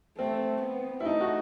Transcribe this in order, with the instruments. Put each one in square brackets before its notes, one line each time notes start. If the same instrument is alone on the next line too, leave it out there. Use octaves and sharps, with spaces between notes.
[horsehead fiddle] A3 [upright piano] C4
[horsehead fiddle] B3
[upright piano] E4
[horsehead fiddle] A3 [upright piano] D#4
[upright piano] F#4